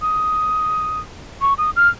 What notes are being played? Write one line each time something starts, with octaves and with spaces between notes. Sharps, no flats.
D#6
C#6
D#6
F6